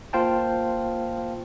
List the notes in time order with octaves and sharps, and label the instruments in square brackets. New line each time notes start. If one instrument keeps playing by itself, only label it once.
[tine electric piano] A#3 F4 C5 F5 G5 A5